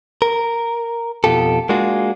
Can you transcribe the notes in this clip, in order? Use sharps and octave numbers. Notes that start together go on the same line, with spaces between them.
A#4
F2 B2 F4 G4 A4
G#3 A#3 D4 F4 F#4 G#4